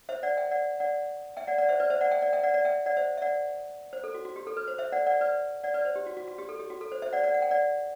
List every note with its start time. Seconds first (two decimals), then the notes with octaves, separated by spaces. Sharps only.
0.09 C5 E5
0.23 D5 F#5
0.37 E5 G5
0.51 D5 F#5
0.80 D5 F#5
1.37 E5 G5
1.47 D5 F#5
1.58 D5 F#5
1.69 C5 E5
1.80 B4 D5
1.90 C5 E5
2.01 D5 F#5
2.11 E5 G5
2.22 D5 F#5
2.33 E5 G5
2.43 D5 F#5
2.54 D5 F#5
2.65 E5 G5
2.86 D5 F#5
2.97 C5 E5
3.17 E5
3.22 D5 F#5
3.93 C5
4.04 A4
4.14 F#4
4.25 F#4
4.36 G4
4.47 A4
4.57 B4
4.67 C5
4.78 C5 E5
4.92 D5 F#5
5.06 D5 F#5
5.21 B4 D5
5.63 D5 F#5
5.74 B4 D5
5.85 C5
5.96 G4
6.07 F#4
6.17 F#4
6.28 F#4
6.38 G4
6.49 A4
6.59 G4
6.70 F#4
6.81 A4
6.92 C5
7.02 C5 E5
7.13 D5 F#5
7.23 D5 F#5
7.34 F#5
7.42 G5
7.51 D5 F#5